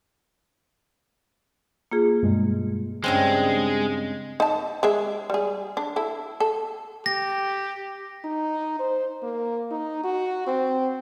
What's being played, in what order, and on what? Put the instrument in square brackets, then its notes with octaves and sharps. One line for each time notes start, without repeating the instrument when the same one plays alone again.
[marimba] A#3 F4 G#4
[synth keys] G2 B2 G#3
[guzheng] G2 C#3 C4 [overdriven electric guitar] G#3
[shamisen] D#4 A5
G#3 G#4 E5
G3 G#4
D4
E4 A4
A4
[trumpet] G4 [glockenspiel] A#6
[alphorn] D#4
C5
A#3
D#4
F#4
C4